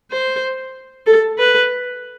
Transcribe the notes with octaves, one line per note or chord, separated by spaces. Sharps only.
C5
A4
B4